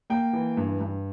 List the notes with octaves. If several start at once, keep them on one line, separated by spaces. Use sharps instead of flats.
A#3 G5
E3
G2
G2